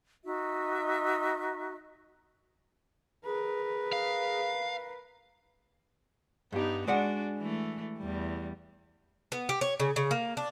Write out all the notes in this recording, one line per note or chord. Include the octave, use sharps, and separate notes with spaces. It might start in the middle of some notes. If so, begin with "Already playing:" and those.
D#4 F#4 E5
G#4 A#4 B4
F5
G2 B3 D#4 G4
G#3 D4 F#4 D5 F#5
E3 A3
E2 G3
B3
G4
C#5
C#3
C#3
A#3
D4